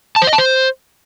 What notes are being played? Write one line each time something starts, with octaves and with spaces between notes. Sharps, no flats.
A5
C5
D#5
A5
C5